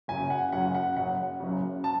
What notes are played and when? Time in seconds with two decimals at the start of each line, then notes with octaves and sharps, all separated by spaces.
0.08 F#1 F#2 C#3 G#5
0.30 F#5
0.52 F#1 F#2 C#3 F#5
0.75 F#5
0.96 F#1 F#2 C#3 F#5
1.40 F#1 F#2 C#3
1.84 A5